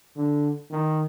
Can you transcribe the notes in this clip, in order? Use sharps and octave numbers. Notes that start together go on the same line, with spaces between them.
D3
D#3